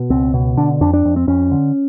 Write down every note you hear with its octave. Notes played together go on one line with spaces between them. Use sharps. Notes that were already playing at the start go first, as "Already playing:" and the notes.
Already playing: B2
C#2 C4
B2
D3 D4
F2 D4
D4
F2
C4
F2 C#4
D3